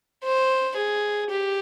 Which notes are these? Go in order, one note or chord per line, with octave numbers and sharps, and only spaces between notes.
C5
G#4
G4